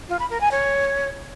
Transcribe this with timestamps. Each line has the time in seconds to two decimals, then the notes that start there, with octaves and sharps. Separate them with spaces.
0.09 F4
0.19 B5
0.30 A#4
0.41 G#5
0.51 C#5